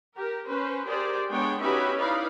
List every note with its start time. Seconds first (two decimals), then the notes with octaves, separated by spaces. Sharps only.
0.17 G4 A#4
0.48 C#4 B4 C5
0.87 G4 G#4 A#4 C5 D5
1.31 G#3 B3 D4 C#5 G5
1.62 C#4 D#4 F#4 G4 B4 E5
1.96 D#4 E4 B4 D5 F5